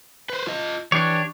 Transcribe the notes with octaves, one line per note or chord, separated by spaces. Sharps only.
B4 C5
F4 D#5
E3 D4 G4 C#5